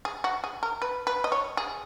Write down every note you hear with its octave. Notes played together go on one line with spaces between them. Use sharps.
G#4
F#4
G#4
A#4
B4
B4
D#5
C#5
G#4